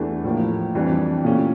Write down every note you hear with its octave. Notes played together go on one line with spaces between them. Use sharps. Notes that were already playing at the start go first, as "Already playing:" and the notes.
Already playing: E2 E3 A3 D4 G4
A2 F3 A#3
F2 E3 G3 D4
A#2 A3 C#4 G4